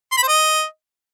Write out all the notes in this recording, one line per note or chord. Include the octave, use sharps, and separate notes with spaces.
C6
B5
C5
D#5